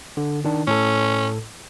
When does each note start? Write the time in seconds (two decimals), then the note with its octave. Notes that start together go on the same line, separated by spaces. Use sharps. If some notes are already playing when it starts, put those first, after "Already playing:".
0.17 D3
0.45 D#3 D4
0.67 A2 C#4 A4